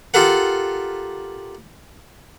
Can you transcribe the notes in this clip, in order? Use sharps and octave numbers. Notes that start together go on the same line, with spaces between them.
F4 G4 A4 A#4 F#5